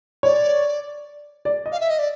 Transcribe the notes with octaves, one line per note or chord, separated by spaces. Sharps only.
C#5 D5
D5
D#5
F5
E5
D#5
D5